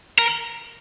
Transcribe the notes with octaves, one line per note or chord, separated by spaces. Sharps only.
A#4